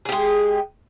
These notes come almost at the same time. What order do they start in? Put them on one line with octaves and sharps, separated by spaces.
G#4 G4 G#3